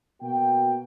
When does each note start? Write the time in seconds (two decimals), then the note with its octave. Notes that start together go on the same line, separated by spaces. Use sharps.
0.21 B2 A#3 F#4 G5